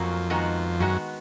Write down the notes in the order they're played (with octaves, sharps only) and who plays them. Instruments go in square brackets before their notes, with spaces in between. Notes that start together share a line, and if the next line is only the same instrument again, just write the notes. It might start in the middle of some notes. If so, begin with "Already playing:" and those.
Already playing: [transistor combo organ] F2 [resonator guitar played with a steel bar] G#2 F#3 A#3 C#4 F#4
[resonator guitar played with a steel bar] D#3 G#3 B3 D#4 F#4
[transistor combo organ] F#2 [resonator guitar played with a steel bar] D#3 G#3 B3 F#4